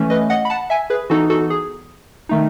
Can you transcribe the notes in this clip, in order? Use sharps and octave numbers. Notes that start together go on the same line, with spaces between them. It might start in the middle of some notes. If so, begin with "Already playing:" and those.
Already playing: E3 A3 C#4
B4 D#5
D#5 F#5
B5
F#5 A5
E5 G#5
G#4 B4
E3 B3 D#4 F#4 A4
F#4 A4
G#4
D#3 A3 D#4